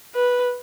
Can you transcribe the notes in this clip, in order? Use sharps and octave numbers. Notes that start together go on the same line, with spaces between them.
B4